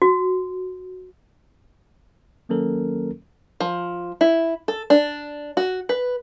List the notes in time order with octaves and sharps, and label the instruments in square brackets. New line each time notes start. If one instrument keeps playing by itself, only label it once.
[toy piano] F#4
[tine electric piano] D#3 F#3 A#3 C#4 A4 A#4
[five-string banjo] F3
E4
A4
D4
F#4
B4